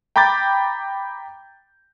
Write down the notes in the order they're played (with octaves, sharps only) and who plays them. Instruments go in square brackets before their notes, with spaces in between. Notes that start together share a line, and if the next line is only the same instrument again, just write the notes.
[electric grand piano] G5 A#5 B5 D6 G6 A6